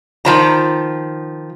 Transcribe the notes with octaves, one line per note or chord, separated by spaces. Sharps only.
D#3 F3 A#5